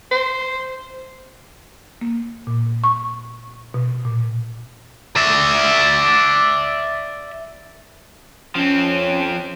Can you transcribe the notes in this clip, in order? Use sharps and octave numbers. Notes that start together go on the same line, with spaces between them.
C5
A#3
A#2
C#6
B2
A#2
D5 E5
F3 C4 C#4